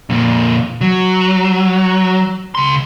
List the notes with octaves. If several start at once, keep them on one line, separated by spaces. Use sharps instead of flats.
F2 A#2
F#3
C#2 C6